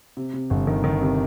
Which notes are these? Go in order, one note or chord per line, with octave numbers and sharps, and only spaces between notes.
C3
C3
G1
D#3
D#3
C3